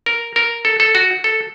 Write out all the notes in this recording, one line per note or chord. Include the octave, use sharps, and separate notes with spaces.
A#4
A#4
A4
A4
F#4
A4